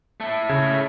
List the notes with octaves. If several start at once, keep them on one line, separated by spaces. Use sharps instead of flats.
A3 E4
C#3 G#6